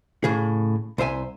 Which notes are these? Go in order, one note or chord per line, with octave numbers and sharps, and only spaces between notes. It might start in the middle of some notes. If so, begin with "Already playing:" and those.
A2 C#3 G#4
C2 C5 E5 G#5